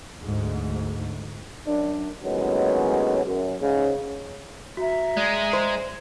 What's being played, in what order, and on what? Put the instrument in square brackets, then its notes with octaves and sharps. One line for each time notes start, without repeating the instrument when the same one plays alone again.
[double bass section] D2 G#2
[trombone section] F#2 D4
D#2 A2 F#3 G#3 B3 C#4
F#2
G#2 C#3
[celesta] F#4 [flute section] E5 A#5
[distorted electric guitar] G#3 [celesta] D5
[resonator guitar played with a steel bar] C5